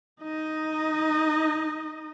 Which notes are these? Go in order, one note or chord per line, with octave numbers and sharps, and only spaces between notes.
D#4 D#5